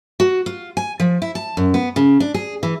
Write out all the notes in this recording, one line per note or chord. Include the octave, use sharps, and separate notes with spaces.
F#4
F4
G#5
F3
E4
A5
F#2
B3
C#3
D4
G#4
E3